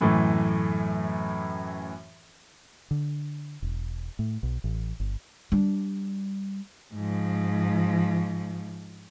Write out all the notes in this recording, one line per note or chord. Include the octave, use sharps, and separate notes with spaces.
F#2 A2 E3 A3
D3
E1
A2
B1
A1
G1
G3 D4
G#2 F3